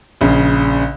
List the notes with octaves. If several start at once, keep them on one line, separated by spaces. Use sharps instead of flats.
A#1 C#3